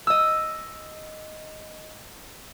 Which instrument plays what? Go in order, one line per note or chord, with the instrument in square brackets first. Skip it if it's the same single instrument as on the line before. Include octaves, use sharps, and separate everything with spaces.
[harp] D#5 E6